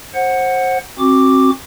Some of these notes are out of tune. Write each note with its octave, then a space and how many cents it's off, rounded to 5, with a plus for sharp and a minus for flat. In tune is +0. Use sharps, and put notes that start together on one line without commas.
C5 +25 F#5 +0
C4 +30 F#4 +0 D6 +0